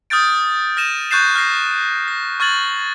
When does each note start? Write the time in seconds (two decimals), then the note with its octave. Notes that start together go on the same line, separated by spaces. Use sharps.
0.10 D#6 F6 G6 A6 D7
0.77 F6 A#6 D#7 E7
1.11 C#6 F#6 G6 A6 C7 E7
1.35 F6 G6 A#6 C7
2.08 A#6
2.40 C#6 F6 G#6 A6 F#7